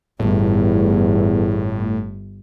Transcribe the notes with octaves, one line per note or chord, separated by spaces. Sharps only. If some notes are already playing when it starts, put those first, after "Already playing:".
G1 E2 A2